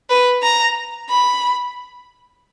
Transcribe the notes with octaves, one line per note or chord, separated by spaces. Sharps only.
B4
A#5
B5